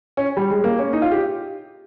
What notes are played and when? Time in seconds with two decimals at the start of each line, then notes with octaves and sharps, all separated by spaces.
0.17 C#4
0.37 G3
0.50 G#3
0.64 A#3
0.79 C#4
0.93 D#4
1.02 F4
1.11 G4